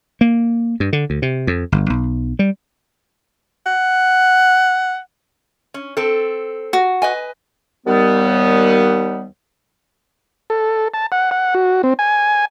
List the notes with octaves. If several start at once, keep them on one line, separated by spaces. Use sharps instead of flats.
A#3
G2
D3
D2
C3
F2
G1
B1
G3
F#5
C#4
C4 A4
F#4
B4 D#5 G#5
D#2 G3 B3
A4
A5
F#5
F#5
F#4
C4
G#5